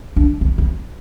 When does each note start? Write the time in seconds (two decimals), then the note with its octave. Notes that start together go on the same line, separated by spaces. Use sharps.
0.16 D4
0.41 C4
0.58 C4